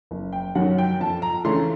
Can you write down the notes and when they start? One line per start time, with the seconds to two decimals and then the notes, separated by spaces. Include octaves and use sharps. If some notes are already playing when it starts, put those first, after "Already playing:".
0.11 F#1
0.32 G5
0.55 F#2 D#3 F#3 F#5
0.78 G5
1.00 F2 A5
1.22 A#5
1.45 C#3 E3 A3 D4 C6